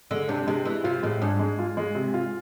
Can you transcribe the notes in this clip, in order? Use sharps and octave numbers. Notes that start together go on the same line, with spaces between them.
D3 G#3
C3 D4
C3 G#3
E3 G#3
C3 F4
A2 G#3
G#2 D4
G#3
F4
G#3
C3
F4